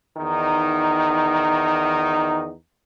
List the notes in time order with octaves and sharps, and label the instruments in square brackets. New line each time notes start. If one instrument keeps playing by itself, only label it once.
[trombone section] E2 D#3 D#4